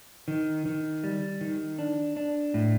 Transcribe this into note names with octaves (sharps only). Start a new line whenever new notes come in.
D#3
D#3
G3
D#3
D4
D4
A2